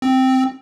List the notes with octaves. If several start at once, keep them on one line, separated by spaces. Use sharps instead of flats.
C4